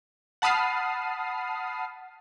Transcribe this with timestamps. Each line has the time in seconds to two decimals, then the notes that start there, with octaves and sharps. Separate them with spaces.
0.42 F#5 A5 B5 D#6 F6 C7